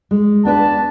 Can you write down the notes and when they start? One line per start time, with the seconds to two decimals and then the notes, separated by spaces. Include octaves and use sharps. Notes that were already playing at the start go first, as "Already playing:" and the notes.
0.11 G#3
0.45 B3 D4 B4 A5